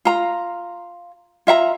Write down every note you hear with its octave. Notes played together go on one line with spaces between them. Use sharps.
F4 A#5
F4 E5 F5 A#5